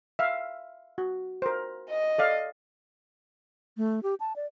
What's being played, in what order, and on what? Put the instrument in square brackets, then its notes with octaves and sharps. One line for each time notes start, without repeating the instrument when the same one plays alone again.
[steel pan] E5 F5
F#4
A#4 C5
[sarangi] D#5
[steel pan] A4 D5 F5
[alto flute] A3
G4
A5
D5